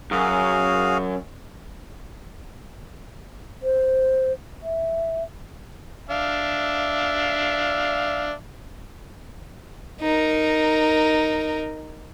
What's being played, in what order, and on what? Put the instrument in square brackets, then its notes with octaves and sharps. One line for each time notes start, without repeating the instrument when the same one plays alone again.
[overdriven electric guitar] F#2 [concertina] F#4 G#4 F5
[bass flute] C5
E5
[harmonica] D4 E5 F5
[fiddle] D#4 A#4